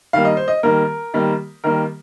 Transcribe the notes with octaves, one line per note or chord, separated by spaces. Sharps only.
D#3 G3 A#3 F5
D#5
C5
D#5
D#3 G3 A#3 A#4
D#3 G3 A#3
D#3 G3 A#3 A#4